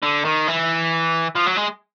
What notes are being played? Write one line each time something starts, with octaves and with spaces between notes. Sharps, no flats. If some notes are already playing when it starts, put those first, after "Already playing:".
D3
D#3
E3
F3
F#3
G#3